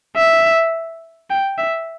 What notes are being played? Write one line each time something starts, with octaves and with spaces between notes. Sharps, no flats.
E5
G5
E5